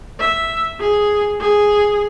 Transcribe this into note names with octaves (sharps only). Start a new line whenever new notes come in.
E5
G#4
G#4